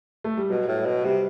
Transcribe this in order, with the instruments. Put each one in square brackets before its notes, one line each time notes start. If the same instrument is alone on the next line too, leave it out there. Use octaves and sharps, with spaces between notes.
[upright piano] A3
G3
[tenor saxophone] B2 [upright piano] F#3
[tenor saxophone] A2
B2
[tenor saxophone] C3 [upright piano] G3